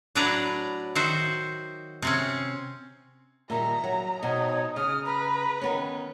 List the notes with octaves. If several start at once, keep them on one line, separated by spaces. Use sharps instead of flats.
A2 F#3 D4 B4 D5 A#5
D#3 F#4 C5 E5
C3 C4 C#4
A#2 D#3 G3 E5 A#5
F#3
B2 C4 D#4 C#5
C#3 D#6 F6
B4 A#5
D#3 B3 C#4